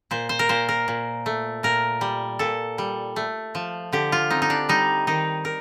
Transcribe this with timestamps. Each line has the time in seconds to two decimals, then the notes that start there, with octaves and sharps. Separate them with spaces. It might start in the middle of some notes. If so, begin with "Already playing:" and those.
0.11 A#2 C5
0.29 C5
0.39 A#4
0.49 A#2 C5
0.69 A#4
0.88 A#2
1.26 A3
1.63 A#2 A#4
2.01 G3
2.39 A#2 A4
2.78 G3
3.16 A3
3.55 F3
3.93 D3 G4
4.12 F4
4.30 C4 D#4
4.42 D#4
4.50 D4
4.69 G3 D#4
5.07 D#3 D#4
5.45 A#4